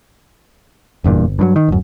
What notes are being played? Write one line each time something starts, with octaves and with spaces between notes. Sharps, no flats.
F#1 E2 G2 A#2
G1
G2 D#3 F#3
D#3
D1 F#2